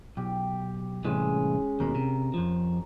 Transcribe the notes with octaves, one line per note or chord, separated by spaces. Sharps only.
B1 G4
C2 A2 E3 G#3 C#4
D#2 B2 A#4
C3
F2 F3